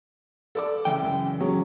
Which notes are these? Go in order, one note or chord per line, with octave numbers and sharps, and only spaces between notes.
A4 D5 D6
C#3 E3 G5
F#2
F#3 C#4 G#4